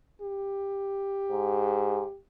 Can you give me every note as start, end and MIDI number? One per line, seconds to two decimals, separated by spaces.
0.22 2.17 67
1.31 2.04 44